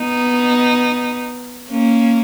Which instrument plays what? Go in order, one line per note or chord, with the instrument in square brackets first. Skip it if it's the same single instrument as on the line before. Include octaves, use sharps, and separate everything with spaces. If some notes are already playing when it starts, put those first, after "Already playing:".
Already playing: [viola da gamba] B3 D#4
A#3 C#4